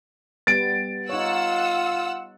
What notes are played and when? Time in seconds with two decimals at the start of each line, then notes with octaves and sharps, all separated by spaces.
0.47 G3 B3 A6 D7
1.09 D#4 F4 C#5 F#5 E6